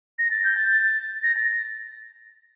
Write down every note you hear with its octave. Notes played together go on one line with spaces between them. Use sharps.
A#6
A6
G6
A6
A#6
A6